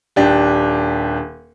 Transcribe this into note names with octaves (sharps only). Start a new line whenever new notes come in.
D#1 D4 G4